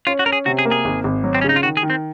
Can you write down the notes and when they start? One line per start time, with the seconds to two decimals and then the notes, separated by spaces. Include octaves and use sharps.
0.07 C#4 F4
0.19 F#4
0.26 C#4 A#4
0.32 G#4
0.46 C3 F#4
0.59 G#4
0.65 A#3
0.71 G#4
0.85 G#1
1.04 G#1
1.24 F#3
1.35 C4
1.41 C#4
1.44 C#3 D#4
1.56 F4
1.63 D#3 F#4
1.77 G#4
1.83 D#3
1.90 C4